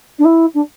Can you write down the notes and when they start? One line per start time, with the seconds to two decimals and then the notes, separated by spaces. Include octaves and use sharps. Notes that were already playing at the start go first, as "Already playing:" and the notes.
0.19 D4
0.25 E4
0.54 D4